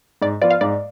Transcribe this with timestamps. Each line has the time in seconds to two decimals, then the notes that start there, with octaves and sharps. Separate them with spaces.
0.22 G#2 D5
0.41 F3 B3 F4 D5
0.51 F5
0.61 G#2 D5